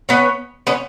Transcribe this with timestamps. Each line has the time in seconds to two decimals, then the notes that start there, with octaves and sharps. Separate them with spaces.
0.09 B3 C#4
0.67 B3 C#4